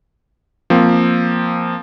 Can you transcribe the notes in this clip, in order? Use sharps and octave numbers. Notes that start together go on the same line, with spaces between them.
F3 A#3 C4